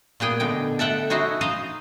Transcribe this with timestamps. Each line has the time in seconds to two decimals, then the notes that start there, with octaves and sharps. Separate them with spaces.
0.20 A#2 B3 G#4 G5
0.40 B2 D3 G5
0.79 A4 E5 F#5 G5
1.10 D#4 E4 F#4 G#4 C5 C#5
1.41 D#4 C5 D#5 F5